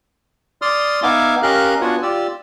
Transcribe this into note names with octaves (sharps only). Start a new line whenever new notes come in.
D5 C6 D#6 F6
B3 D#4 E5 F5 G#5 D6
C#4 G4 A#4 D#5 F5 F#6
B3 D4 F4 F#4 F#5 G#5
F4 G4 D5 E6